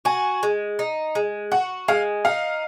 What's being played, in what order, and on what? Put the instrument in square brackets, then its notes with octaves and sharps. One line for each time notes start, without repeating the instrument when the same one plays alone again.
[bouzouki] F#4 [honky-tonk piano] G#5
[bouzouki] G#3
D#4
G#3
[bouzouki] F#4 [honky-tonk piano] F#5
[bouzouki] G#3 [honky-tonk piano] F5
[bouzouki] D#4 [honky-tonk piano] F5